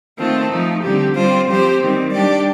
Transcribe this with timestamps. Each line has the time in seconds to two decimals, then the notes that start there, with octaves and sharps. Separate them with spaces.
0.18 D#3 A3 C4 F4 A4
0.50 F3 A3 D#4
0.82 D3 G3 C4 G4
1.15 G3 C4 F4 C5
1.48 F3 C4 G4 C5
1.81 D#3 G3 C4
2.12 G3 D4 G4 D5